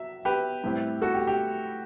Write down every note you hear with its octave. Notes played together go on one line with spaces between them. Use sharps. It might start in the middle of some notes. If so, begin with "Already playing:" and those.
Already playing: F#3 E5
G4 B4
A2 G3 C4 E4
F#4 A4
G4
G4